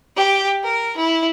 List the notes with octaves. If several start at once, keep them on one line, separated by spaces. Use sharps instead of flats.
G4
A#4
E4